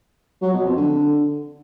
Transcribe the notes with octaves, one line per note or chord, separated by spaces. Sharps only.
F#3
B2
F2
D3